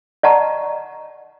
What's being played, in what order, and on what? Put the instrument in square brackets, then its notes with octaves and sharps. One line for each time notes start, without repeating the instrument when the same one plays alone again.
[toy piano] D5 D#5 F#5 A5 A#5 C#6